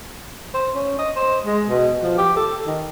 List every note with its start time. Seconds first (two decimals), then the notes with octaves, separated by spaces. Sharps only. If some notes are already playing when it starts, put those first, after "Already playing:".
0.54 C5
0.75 C#4
0.98 D#5
1.16 C5
1.46 G#3
1.69 B2
2.02 F3
2.18 G4
2.36 A4
2.66 D#3